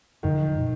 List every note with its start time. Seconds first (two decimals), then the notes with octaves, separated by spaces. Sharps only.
0.23 F#2 D3 D#3 F3 G#3
0.59 B2